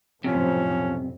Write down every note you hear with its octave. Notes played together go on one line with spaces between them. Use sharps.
B1 F2 A2 C3 F3 C#4